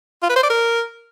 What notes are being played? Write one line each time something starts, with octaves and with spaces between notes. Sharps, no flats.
F4
B4
C5
D5
A#4